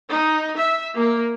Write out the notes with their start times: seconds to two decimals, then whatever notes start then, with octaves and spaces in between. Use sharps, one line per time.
0.11 D#4
0.57 E5
0.96 A#3